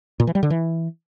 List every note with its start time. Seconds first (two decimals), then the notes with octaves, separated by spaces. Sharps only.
0.20 A#2
0.27 E3
0.35 G3
0.43 D3
0.50 E3